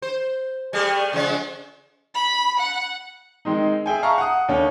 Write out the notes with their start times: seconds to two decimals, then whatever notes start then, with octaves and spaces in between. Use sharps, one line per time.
0.02 C5
0.73 G3 A3 G#4
1.13 C#3 F3 G#3
2.14 B5
2.59 F#5
3.45 D#3 G#3 C4 D#4
3.86 G#4 E5 G5 G#5
4.03 E5 F5 A5 A#5 C#6
4.18 F#5 D#6
4.48 D#2 D3 C#4